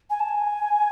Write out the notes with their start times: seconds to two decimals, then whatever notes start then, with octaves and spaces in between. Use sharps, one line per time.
0.10 G#5
0.20 A5
0.29 G#5